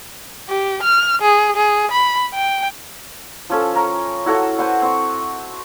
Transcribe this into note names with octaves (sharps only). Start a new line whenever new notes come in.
G4
F6
G#4
G#4
B5
G5
F3 C#4 A4
A#4 C#5 A#5
E4 F#4 A4 C#5
B4 C5 F#5 C6
C4 C#6